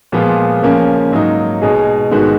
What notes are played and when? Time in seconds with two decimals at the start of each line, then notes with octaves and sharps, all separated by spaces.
0.12 A#2 F3 G#3 B3 F4
0.62 C#3 F3 A#3 C#4
1.12 G#2 F#3 A#3 D#4
1.62 B2 G#3 D#4 G#4
2.11 G#2 D#3 G#3 B3 F#4